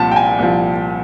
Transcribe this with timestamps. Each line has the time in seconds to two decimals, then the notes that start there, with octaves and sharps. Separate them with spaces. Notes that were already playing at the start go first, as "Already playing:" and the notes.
Already playing: C2 A#2 F3 A5
0.11 G5
0.16 G#5
0.39 C2 A#2 F3